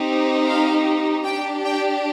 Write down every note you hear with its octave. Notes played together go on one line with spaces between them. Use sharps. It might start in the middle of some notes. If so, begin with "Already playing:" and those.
Already playing: C4 D#4 G4
F5
D4 G4 G5
G5